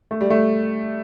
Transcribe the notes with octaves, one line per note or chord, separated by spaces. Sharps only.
A3
G3
A3